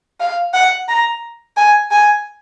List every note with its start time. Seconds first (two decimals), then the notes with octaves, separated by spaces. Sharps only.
0.20 F5
0.54 F#5
0.88 A#5
1.57 G#5
1.91 G#5